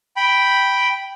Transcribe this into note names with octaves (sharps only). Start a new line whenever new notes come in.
G5 B5